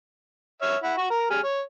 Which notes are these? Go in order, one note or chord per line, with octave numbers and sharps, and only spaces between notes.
C#5 E5 F6
E4 F#5
F#4 C#6
A#4 A#5
G3 G#4 F6
C#5